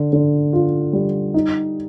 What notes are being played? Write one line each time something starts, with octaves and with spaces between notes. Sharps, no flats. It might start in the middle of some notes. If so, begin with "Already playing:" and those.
Already playing: D3
D3
F4
G3
D#4